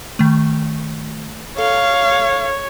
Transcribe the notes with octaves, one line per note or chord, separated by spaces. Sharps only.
D#3 A3
A4 C#5 F5